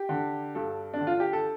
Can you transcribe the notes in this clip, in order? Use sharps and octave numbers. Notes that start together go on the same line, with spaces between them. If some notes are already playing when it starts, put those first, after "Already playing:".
Already playing: G4
D3
G2 A4
D4
D3
F4
G4
A4